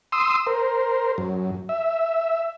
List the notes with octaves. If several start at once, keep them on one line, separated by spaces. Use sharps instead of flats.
C6 D#6 E6
A#4 C5
F#2
E5